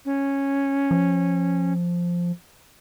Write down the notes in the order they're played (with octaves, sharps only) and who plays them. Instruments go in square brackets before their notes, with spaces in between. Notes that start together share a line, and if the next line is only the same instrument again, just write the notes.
[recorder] C#4
[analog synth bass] F3